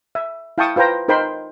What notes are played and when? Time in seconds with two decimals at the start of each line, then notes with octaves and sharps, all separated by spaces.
0.15 E5
0.58 E4 F5 G5 A5 C#6 D#6
0.76 F4 B4 C5 G5 A#5
1.08 D#4 A#4 C5 G5 B5 C6